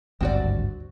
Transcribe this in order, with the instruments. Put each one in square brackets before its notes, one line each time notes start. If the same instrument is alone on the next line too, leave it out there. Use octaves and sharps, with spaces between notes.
[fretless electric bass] G#1 D2 G2 [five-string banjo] C4 F#4 D5